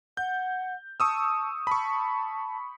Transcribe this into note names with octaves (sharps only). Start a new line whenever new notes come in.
F#5 G6
A5 C#6 D#6 E6
A5 B5 C#6